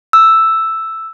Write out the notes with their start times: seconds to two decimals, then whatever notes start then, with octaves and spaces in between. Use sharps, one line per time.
0.13 E6